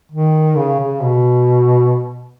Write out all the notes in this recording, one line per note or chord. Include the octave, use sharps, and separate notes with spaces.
D#3
C#3
C#3
B2